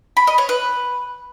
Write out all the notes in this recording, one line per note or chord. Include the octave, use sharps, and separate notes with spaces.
B5
D#5
C#5
B4